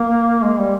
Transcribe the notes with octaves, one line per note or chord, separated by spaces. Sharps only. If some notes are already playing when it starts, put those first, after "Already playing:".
Already playing: A#3
G#3
G3